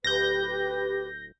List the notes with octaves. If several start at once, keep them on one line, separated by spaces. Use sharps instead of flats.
D1 G4 B4 G6 A#6